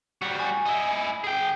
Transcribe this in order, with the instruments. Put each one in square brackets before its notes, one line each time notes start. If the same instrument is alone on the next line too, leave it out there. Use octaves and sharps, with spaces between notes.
[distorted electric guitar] G3 F#4
[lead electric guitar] G#5
[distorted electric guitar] D#4 E4
G#4 G5